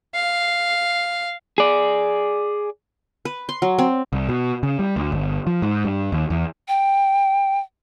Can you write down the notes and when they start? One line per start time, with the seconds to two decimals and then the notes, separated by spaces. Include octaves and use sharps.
0.14 F5
1.58 G#4 D5
3.25 B4
3.49 C6
3.62 F#3
3.79 C4
4.13 C2
4.29 B2
4.63 C#3
4.79 G3
4.96 D2
5.12 G1
5.47 F3
5.62 G#2
5.85 G2
6.12 D#2
6.30 E2
6.68 G5